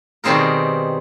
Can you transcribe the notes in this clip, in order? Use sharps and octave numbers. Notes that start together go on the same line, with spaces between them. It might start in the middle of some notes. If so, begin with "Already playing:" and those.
B2 D#3 G3 C4 G#4 A#4